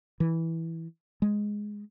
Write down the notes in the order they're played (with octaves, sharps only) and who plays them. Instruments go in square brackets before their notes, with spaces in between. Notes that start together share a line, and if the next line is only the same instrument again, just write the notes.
[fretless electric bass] E3
G#3